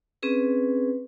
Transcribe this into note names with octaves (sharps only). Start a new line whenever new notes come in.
C4 C#4 G#4 B4